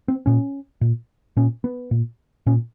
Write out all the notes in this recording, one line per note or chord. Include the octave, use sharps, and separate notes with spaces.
C4
A#2 C#4
A#2
A#2 C#4
B3
A#2
A#2 C#4